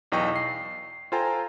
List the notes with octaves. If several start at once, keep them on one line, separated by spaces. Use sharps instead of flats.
B1 E2 D#5 G5 C#6
C7
F4 A4 C5 G5 G#5 A#5